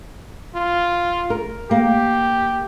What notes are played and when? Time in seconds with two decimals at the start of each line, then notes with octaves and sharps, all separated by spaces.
0.55 F4
1.30 A#4
1.71 A#3 G4